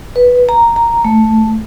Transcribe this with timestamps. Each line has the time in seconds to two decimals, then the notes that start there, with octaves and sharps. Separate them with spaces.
0.16 B4
0.49 A#5
0.76 A#5
1.05 A3